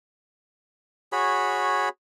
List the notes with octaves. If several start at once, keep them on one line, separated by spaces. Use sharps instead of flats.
F#4 G#4 C#5 B5